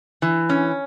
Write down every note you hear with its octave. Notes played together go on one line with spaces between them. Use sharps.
E3
C#4